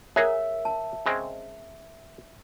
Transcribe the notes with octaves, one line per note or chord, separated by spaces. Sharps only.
G#4 A#4 C#5 E5 F#5 A#5
A5
C#3 G#3 C4